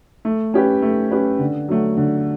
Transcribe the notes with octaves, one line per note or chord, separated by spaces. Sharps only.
A3
C#4 G4 B4
A3
C#4 G4 B4
D3
F#3 A3
D3